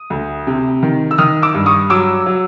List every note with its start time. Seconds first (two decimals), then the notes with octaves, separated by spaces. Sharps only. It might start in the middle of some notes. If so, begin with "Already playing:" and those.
Already playing: D#6
0.10 D2
0.47 C3
0.83 D#3
1.11 E6
1.18 D#3 D#6 F6
1.42 D6 E6
1.54 G2
1.66 C#6 D#6
1.90 F#3 D6 E6
2.26 F#3